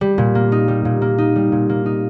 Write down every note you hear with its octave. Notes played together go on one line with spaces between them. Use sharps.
G3
A#2
A#3
D#4
G3
A#2
A#3
D#4
G3
A#2
A#3
D#4